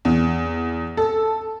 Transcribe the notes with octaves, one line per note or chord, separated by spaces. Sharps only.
E2
A4